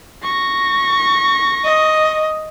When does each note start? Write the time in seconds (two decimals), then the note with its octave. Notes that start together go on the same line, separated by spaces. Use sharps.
0.23 C#6 A#6
1.65 D#5